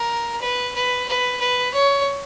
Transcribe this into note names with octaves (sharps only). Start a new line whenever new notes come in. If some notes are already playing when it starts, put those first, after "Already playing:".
Already playing: A#4
B4
B4
B4
B4
C#5